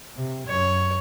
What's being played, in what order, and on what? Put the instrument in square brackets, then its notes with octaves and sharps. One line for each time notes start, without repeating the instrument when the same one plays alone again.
[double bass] C3
[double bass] F#2 [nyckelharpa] C#5